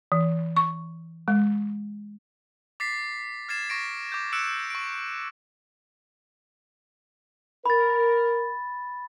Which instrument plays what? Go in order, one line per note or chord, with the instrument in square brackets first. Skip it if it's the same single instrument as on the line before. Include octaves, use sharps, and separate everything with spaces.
[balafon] E3
C#6
G#3
[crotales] D6 A6 B6 C7
F6 G#6 A6 C7 E7
C#6 A#6 D7
D6 G6
E6 F#6 C#7 D7 E7
C#6 D7
[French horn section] A#4 [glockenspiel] B5 A6